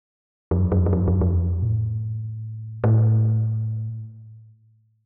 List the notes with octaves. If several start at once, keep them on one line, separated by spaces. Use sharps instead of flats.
F2
F#2
F2
F#2
F2
F#2
F2
F#2
F2
F#2
F2
A#2
A2
A2